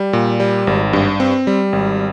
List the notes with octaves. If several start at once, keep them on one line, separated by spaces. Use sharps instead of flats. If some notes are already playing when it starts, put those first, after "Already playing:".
Already playing: G3
A#2
G3
G#1
G2
C4
G3
G#1